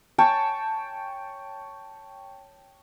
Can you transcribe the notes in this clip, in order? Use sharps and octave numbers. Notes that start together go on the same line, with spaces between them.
C#5 G5 A5 C#6